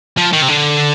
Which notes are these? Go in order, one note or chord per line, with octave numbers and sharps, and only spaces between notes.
F3
D#3
C3
D3